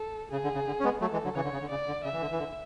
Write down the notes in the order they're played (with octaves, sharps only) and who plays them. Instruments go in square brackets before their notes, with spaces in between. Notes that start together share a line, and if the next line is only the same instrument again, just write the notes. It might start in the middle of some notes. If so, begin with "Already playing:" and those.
Already playing: [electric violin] A4
[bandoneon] C#3 [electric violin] G#4
[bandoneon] D3
C#3
D3
C#4
G#3 B3
[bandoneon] F#3 A3 [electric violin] A4
[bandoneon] E3 G#3
D3 F#3
[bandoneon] C#3 E3 [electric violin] C#5
[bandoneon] D3
C#3
D3
[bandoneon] C#3 [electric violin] D5
[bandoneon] D3
[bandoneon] C#3 [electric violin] E5
[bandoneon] E3
D3
E3
D3